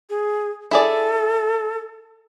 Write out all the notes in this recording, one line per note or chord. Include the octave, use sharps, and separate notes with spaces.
G#4
E4 G#4 A4 D5